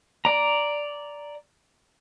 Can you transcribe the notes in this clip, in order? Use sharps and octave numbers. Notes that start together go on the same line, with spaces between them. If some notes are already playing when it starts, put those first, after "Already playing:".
D5 A#5